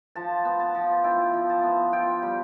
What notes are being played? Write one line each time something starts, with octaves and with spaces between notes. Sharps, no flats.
F3 A5
B3
A5
F3
E4 G5
F3
A5
B3
F4 G5
G3